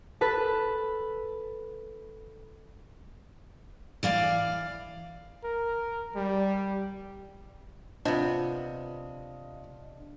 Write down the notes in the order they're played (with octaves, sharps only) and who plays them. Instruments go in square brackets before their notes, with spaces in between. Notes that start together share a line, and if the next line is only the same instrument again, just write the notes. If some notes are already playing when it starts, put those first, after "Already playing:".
[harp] A4 B4 A5
[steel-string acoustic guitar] E3 D5 F5
[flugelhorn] A#4
G3
[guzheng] C3 B3 [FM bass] D4 [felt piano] F4 D#5